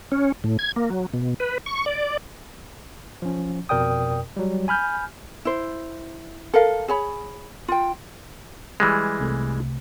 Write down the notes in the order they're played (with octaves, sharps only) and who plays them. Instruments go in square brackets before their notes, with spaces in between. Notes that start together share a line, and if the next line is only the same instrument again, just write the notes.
[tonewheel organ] C#4
A2
G#6
A#3
F#3
B2
B4
C#6
D5
[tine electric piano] F3 C#4
F2 B2 A#4 D5 G5 D#6
F#3 G3
G#5 B5 F6 G6
[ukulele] E4 C5
A4 A#4 F5
G#4 C#5 B5
F4 G5
[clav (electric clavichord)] E3 G3 G#3
[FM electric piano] C2 C3 A3